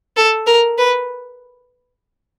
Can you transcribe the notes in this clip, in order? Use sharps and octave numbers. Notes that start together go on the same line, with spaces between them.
A4
A#4
B4